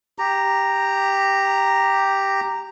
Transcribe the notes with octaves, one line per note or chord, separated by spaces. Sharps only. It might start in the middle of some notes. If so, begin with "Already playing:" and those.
G4 A#5